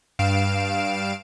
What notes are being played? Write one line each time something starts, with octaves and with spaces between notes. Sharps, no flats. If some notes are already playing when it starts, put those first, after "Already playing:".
G2 F5 D7 E7